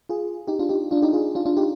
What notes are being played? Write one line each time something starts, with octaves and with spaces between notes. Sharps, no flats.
F4 G#4
D#4 G4
D4 F4
D#4 G4
D4 F4
D#4 G4
F4 G#4
D4 F4
D4 F4
D#4 G4